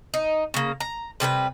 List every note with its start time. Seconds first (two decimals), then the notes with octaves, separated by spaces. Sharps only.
0.14 D#4
0.54 C#3 A#3
0.80 A#5
1.20 C3 G3 G#4 B4